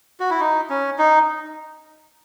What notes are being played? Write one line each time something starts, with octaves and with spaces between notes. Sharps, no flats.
F#4
E4
D#4
C#4
D#4